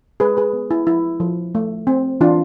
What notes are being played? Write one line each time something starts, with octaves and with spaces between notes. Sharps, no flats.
G#3 G#4 B4
G#4 B4
B3
E4
F3 E4
F3
A3
C4
E3 D4 F4